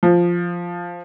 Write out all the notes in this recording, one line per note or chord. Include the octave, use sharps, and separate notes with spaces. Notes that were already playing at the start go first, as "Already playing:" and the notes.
F3